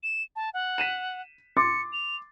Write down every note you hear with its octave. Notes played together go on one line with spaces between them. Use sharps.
E7
A5
F#5
B6 D#7 E7
C6 D6 A6 C#7
F7